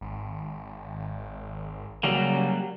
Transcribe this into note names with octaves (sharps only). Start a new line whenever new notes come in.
G#1
C#3 F#3 G3 A#3